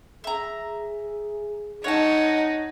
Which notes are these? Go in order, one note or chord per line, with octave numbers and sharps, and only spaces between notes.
G#4 E5 A#5
D#4 C#5 F#5 A5